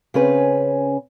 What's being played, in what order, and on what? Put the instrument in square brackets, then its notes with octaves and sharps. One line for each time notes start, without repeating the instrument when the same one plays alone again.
[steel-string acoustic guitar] C#3 C4 C#4 G#4 B4